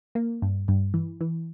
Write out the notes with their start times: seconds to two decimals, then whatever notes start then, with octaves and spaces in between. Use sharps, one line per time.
0.15 A#3
0.42 G2
0.68 G2
0.94 E3
1.21 E3